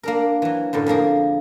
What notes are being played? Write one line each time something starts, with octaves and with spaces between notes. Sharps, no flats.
A#3 D4 A#4
E3 F#3
F#2 A2 D3
F2 F3 A#3 G#4